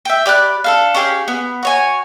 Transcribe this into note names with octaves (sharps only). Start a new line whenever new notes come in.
E5 G5
G4 D5 B5 F#6
D4 A4 F5
C#4 G4 G#4 F5
B3
F#4 C#5 G#5